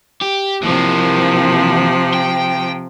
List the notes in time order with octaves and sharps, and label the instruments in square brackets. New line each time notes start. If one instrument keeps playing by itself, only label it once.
[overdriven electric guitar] G4
[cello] C3 F3 [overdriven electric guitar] E3 A#3
[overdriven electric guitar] G5